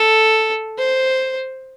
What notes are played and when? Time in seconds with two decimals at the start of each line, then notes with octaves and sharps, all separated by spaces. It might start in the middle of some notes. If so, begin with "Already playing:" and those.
Already playing: A4
0.77 C5